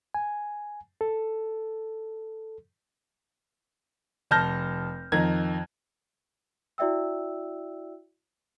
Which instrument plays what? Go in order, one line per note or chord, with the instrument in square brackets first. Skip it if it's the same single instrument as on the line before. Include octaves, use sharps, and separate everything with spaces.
[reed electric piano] G#5
A4
[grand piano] F1 A5 F6 G6 A#6
F2 D#3 A#5 G#6
[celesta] E4 F#4 D5 E5 G5 E6